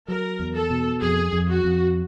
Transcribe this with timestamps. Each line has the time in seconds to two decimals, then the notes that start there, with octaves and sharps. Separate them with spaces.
0.08 F#3 A#4
0.40 E2
0.55 A4
0.70 B2
1.01 F2 G#4
1.33 F2
1.48 F#4
1.64 F2